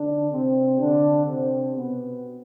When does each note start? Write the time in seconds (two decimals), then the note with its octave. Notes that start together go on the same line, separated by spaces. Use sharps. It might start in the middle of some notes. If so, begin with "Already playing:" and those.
Already playing: D3 D4
0.31 C3 C4
0.79 D3 D4
1.26 C3 C4
1.74 B2 B3